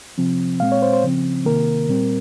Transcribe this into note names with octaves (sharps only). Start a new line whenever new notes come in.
C3 F3 C4
A#2 G#3 C4 F5
C#5
C5
C5
C#3 F3 C4
C3 D#3 A#3 A#4
A#2 G3 C4